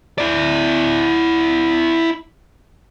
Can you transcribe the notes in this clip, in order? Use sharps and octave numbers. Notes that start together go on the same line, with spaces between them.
E4 D5